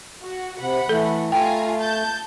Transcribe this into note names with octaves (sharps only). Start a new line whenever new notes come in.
F#4
C3 F#5 B5
E3 A3 A4
A3 F4 G5 G#5 A#5
A5 G6